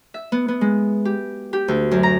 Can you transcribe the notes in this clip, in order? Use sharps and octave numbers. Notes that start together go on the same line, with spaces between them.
E5
B3
B3
G#3
G4
G4
D2
F#2
A#5